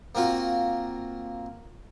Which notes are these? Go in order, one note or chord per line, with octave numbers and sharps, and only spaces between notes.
A#3 C4 F4 F#4